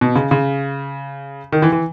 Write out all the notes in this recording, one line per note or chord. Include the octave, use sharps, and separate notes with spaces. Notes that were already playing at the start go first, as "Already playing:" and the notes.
B2
C#3
C#3
D#3
E3
E3